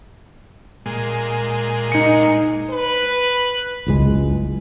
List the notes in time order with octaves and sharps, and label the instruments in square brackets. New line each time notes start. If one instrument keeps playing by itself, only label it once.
[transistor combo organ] A#2 G#3
[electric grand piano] D#4 C#7
[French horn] B4
[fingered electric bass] F#1 C#2 G#3